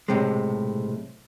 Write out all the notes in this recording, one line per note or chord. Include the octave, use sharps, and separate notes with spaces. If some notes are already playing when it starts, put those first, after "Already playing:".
B1 A2 C3 G#3